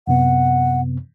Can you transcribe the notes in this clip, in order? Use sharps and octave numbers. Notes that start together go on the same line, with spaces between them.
F#2 C3 B3 F#5